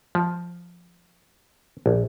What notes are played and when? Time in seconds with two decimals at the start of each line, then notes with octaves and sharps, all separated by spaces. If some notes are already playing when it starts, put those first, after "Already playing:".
0.15 F3
1.86 A#1